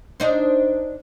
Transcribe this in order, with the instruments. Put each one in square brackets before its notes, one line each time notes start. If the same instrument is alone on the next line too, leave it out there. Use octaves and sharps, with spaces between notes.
[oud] D4 D#4 C5